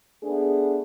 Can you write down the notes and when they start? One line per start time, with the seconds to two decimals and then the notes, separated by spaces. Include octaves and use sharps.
0.23 A3 B3 D4 G#4